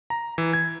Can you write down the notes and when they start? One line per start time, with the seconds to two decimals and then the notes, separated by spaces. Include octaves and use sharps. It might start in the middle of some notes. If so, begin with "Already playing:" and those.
0.10 A#5
0.38 E3
0.53 G#6